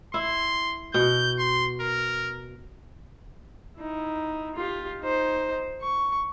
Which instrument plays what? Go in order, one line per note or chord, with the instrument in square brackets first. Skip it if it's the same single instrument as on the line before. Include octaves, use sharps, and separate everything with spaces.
[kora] E4 [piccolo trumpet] C6
[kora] B2 [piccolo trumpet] G6
[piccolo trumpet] C6
A#4
[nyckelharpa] D#4 E4
F4 G4
D#4 C5
C#6